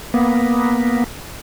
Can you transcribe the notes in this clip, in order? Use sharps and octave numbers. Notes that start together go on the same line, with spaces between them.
A#3 B3